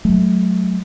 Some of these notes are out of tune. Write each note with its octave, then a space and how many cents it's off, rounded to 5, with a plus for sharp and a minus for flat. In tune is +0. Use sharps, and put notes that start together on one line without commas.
F#3 +0 A3 -25